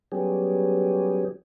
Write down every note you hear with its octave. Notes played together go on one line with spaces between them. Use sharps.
F#3 G3 B3 C#4 G4 G#4